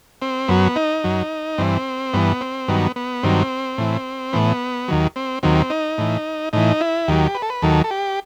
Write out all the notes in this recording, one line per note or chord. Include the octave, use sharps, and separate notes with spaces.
C4
F#2 F#3 B3
D#4
F#2 F#3
G2 E3 C4
G2 E3 B3
C4
G2 D#3 F#3 B3
B3
G2 D#3 F#3 C4
A2 E3
A2 E3 B3
D#2 D#3 F#3
C4
D#2 D#3 F#3 C4
D#4
A2 E3
A2 E3 D#4
E4
D#2 D#3 F#3 G4
B4
A4
B4
D#2 D#3 F#3 A4
A4
G4